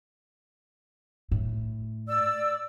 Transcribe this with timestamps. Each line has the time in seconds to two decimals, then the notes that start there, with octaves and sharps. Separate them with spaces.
1.31 A2
2.07 D5 E6